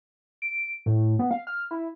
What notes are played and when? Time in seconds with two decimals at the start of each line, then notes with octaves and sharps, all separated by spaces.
0.42 D7
0.86 A2
1.19 B3
1.31 F5
1.47 F6
1.71 E4